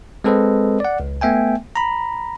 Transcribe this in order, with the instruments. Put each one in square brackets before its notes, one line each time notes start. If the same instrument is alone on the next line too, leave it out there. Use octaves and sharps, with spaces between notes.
[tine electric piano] G#3 C4 A4 B4 C5 D#5
D5 F#5
C#2
A3 B3 E5 G5 G#5
A#5 B5